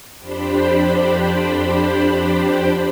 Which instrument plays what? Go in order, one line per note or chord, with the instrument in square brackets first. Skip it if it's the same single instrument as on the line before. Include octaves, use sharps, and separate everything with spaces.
[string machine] F2 D4 G4 C5 B5